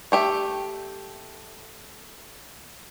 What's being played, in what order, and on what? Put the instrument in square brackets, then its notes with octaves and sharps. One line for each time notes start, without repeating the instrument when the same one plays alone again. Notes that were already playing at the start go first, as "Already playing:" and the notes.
[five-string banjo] A3 G4 E5